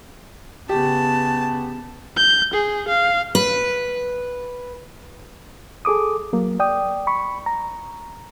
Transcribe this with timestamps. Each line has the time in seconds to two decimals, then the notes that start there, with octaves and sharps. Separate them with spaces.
0.69 C#3 B3 G4 A5
2.16 G6
2.53 G#4
2.88 F5
3.35 B4
5.85 G#4 A4 D6 D#6
6.33 F#3 A#3
6.60 D5 G5 D#6
7.07 B5 C#6
7.46 A#5